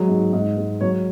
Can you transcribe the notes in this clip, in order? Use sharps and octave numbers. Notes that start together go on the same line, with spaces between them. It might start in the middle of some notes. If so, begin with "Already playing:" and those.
Already playing: F#3 G#3
G#2
G#2
G#3
F#3 C#5